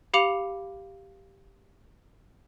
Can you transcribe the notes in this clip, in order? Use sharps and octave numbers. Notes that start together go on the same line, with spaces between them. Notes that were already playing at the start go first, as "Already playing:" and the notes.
G4 F5 B5 D6 C#7 F7